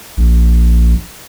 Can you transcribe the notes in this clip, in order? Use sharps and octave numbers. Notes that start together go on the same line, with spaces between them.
A#1